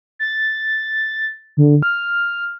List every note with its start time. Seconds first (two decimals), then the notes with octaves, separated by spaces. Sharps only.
0.19 A6
1.57 D3
1.83 F6